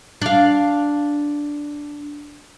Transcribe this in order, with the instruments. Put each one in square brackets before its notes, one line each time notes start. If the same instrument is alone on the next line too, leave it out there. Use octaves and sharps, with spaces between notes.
[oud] D4 F5